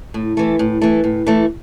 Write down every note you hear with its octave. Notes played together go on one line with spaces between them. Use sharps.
A2
E3 A3
A2
E3 A3
A2
E3 A3